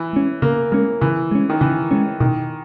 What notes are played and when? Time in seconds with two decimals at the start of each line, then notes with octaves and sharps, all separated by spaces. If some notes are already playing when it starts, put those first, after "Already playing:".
Already playing: E3
0.13 G#3 C#4
0.42 C#3 A#3
0.72 G#3 A#3 C#4
1.01 C#3 E3
1.31 G#3 C#4
1.49 D#3
1.61 C#3 E3
1.91 G#3 C#4
2.20 B2 D#3